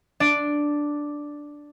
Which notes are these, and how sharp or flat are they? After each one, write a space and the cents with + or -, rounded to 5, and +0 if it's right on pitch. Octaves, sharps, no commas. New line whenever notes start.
D4 +0 D5 +0